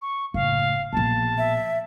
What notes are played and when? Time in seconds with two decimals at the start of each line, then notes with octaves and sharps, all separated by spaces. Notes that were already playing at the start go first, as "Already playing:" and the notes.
0.02 C#6
0.34 F#1 A2 F5
0.93 A#1 B2 A5
1.38 E5